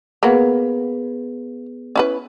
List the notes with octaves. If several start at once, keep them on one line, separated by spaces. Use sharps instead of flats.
A#3 B3 F#4 G#4 B4
C#4 E4 B4